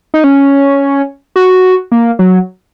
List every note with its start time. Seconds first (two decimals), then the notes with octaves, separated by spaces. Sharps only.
0.14 D#4
0.24 C#4
1.36 F#4
1.92 A#3
2.19 F#3